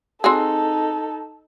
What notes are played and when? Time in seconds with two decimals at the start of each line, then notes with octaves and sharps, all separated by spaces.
0.24 C4 D#4 F#4 G#4 A4